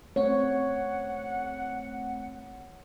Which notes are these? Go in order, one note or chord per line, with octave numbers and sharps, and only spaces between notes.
A3 C4 C#5 F#5